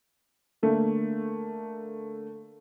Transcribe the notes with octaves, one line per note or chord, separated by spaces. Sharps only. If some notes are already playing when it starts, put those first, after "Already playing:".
D3 A3 A#3